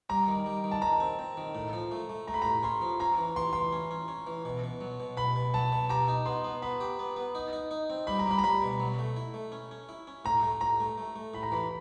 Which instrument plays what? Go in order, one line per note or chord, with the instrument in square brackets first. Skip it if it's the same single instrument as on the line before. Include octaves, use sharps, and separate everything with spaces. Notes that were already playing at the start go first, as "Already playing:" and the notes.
[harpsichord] G3 [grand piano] A#5
[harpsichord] D#3
G3
D#3
[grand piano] A5
[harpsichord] D#3 [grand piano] A#5
[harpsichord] C4
C4
D#3
A2
F3
A3
A3
[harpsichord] A3 [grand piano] A#5
[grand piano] B5
[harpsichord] A2 [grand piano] A#5
[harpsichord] C#4 [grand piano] C6
[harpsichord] F3
[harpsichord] C#4 [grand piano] A#5
[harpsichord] E3
[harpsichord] E3 [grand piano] C6
[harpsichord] E3 [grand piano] C6
[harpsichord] C#4
C#4
C#4
E3
B2
B2
F#3
B2
[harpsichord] B2 [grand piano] B5
[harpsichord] B2
[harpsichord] F#3 [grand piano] A5
[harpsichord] B2
[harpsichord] G4 [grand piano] A#5
[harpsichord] D#4
[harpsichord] B3 [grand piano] C6
[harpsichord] B3
[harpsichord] B3 [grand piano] B5
[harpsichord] G4
B3
B3
D#4
D#4
D#4
C4
[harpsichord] G3 [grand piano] B5
[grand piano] A#5
[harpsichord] G3 [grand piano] B5
[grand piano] A#5
[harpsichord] G3 [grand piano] B5
[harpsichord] B2
F#3
A3
E4
A3
C#4
C#4
E4
C#4
[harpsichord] A2 [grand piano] A#5
[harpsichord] A3
[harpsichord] A2 [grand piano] A#5
[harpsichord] A3
A3
A3
[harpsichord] A2 [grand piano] B5
[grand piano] A#5
[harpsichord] E3 [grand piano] B5